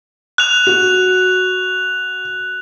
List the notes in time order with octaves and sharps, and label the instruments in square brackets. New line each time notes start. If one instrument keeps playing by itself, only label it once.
[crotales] F#6 F7
[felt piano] F#4